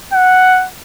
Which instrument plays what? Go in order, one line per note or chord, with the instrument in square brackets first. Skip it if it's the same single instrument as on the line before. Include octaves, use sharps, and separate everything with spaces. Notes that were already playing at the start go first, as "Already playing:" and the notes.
[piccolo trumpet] F#5